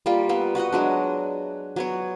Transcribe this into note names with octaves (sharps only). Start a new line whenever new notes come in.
G3 A#3 F4
A#3 B3
F#4 B4 D#5 F#5
F#3 G#3 D4
F#3 B3 C#5